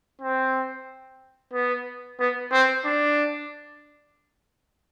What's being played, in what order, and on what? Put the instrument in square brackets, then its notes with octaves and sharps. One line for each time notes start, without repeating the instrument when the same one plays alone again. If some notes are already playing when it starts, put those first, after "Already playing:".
[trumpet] C4
B3
B3
C4
D4